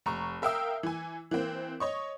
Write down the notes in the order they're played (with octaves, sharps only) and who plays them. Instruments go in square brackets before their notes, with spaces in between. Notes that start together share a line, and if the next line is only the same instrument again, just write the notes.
[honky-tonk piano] F1 A#5 C#6
A#4 E5 F5 G5 D#6 E6
E3 G#5
E3 A#3 C4
C#5 D#5 C#6